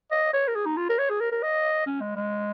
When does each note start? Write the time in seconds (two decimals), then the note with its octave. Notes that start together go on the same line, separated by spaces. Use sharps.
0.11 D#5
0.33 C#5
0.47 A#4
0.55 G#4
0.66 D#4
0.77 F4
0.89 A#4
0.98 C#5
1.09 G#4
1.20 A#4
1.32 A#4
1.42 D#5
1.86 C#4
2.00 G#3
2.15 G#3